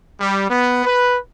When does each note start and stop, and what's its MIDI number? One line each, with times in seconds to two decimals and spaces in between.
0.19 0.46 55
0.49 0.82 59
0.85 1.17 71